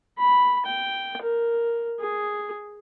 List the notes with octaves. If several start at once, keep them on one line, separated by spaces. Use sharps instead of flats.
B5
G5
A#4
G#4